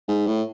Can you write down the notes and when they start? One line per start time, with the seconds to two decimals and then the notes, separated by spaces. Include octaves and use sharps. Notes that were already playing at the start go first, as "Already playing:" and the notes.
0.08 G#2
0.27 A2